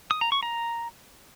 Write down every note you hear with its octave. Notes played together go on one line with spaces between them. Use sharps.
D#6
A#5
C#6
A#5